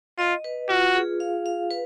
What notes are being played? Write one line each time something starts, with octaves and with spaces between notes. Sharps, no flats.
F4 D#5
B4
F4 F#4
G#4
F5
F5
B4